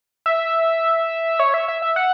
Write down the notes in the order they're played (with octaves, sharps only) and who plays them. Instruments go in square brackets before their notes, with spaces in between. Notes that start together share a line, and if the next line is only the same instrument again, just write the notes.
[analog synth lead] E5
C#5
E5
E5
E5
F#5